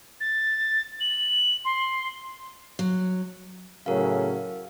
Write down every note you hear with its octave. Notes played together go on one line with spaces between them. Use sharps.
A6
F#7
C6
F#3
A2 C#3 F#3 A#4 F5